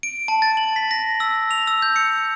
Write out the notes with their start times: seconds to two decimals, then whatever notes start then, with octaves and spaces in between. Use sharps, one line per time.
0.03 D7
0.28 A5
0.42 A6
0.57 F#7
0.76 B6
0.91 A#6
1.20 E6
1.51 F7
1.67 E6
1.82 G6
1.96 C#7